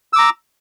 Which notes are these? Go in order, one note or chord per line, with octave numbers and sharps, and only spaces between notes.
A#5 D6 E6